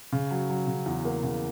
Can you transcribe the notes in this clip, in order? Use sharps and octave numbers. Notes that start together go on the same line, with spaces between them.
C#3
F#3
F#3
C#3
E2
A#3
C#3